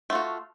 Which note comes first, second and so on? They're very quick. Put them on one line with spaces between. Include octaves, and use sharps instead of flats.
A3 F4 F#4